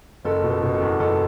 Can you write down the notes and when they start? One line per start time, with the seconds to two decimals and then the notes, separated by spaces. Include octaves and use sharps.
0.25 F#1 A4
0.43 B2
0.50 A4
0.63 B2
0.75 A4
0.82 E2
1.00 F#1 A4